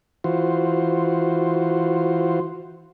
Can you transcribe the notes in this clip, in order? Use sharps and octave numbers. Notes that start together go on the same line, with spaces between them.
E3 F4 F#4 C5